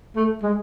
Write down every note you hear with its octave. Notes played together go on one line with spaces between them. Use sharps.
A3
G#3